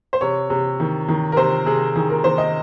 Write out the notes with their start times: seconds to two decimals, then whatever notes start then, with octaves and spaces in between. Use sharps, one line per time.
0.13 C5
0.21 C3 C#5
0.50 C3
0.80 D#3
1.08 D#3
1.32 A#4
1.36 C3 C5
1.66 C3 G#4
1.95 D#3 G#4
2.10 A#4
2.24 D#3 C5
2.38 D#5